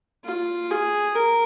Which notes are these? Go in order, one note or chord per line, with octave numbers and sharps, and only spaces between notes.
F4
G#4
A#4